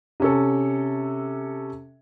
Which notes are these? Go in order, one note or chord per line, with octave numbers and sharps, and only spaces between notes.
C3 C#4 A4